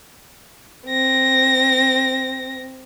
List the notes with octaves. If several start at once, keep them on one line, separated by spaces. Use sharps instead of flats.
C4 A#6